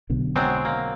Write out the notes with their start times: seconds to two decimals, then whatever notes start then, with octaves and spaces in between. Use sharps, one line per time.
0.10 B1 B2 D3
0.35 F#3 G#3 C4
0.65 A#3